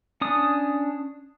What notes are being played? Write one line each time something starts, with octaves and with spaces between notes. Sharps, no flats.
C#4 D4 D#6